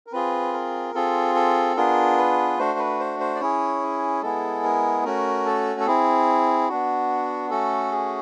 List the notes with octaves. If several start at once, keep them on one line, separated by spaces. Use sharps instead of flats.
A#4
C4 F4 G#4 B4
A#4
C4 F4 G#4 A4
A4
B3 D4 F4 G#4 A#4
B4
A3 D4 F#4 C5
B4
C5
C5
D5
C#4 E4 G#4 C#5
G#3 B3 E4 G#4 A4
A#4
A3 C#4 F#4 A#4
A4
A4
C4 E4 G#4
B3 D4 F#4
A3 C#4 F#4 A4
G#4